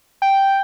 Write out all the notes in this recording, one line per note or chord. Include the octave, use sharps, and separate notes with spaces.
G5